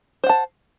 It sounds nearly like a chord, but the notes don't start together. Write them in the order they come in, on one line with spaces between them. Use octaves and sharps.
C5 F#5 A5